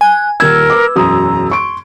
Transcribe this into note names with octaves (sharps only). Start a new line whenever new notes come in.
G#5 F#6
D#1 A#4 E6 G#6
B4 D6
E1 F#2 A#5 D#6
C6 C#6 D7